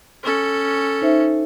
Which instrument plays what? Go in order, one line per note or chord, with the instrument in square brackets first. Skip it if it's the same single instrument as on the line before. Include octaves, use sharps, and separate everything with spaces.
[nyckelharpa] C#4 A4
[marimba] D#4 C5 E5